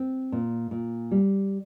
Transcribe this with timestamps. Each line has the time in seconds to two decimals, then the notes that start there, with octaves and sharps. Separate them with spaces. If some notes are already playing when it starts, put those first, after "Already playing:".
Already playing: C4
0.32 A#2
0.71 A#2
1.11 G3